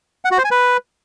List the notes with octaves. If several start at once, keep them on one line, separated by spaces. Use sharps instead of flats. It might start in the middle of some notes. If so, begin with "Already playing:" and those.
F#5
F#4
C5
G#5
B4